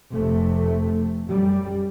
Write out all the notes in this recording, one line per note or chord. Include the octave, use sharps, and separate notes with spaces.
F1 C3 A3
F#2 G3